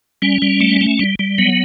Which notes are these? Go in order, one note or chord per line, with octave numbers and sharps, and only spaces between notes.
G3 C#4
G3
A3
A3
G3
G3
F#3 B3